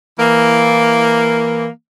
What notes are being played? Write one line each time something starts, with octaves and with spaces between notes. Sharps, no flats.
E3 A#3